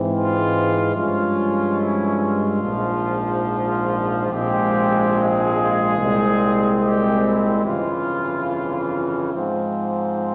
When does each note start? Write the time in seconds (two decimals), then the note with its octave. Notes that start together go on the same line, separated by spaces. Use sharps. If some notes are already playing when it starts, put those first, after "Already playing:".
Already playing: G#2 E3 G#3 C4
0.12 F4
0.95 G2 F3 G#3 C#4 F4
1.79 E4
2.20 F4
2.62 A#1 G#2 F3
4.29 A#1 G#2 F3 G#3 C4 G4
5.13 G#4
5.97 C2 A#2 G#3 C4
6.81 G4
7.22 E4
7.64 G1 F2 C#3 E3 F4
9.31 G#2 F3 C4